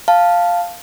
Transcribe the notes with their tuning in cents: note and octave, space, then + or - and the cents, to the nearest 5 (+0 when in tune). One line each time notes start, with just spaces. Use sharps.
F5 +0 A5 +0